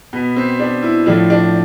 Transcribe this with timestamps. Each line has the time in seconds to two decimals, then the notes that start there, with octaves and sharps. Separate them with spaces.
0.13 B2 B3
0.36 C4
0.59 D4
0.83 E4
1.06 A2 F3 D4
1.30 D4